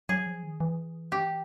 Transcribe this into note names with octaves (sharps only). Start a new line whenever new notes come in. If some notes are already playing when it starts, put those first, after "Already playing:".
F#3 G#4
F3
D#3
E3
G4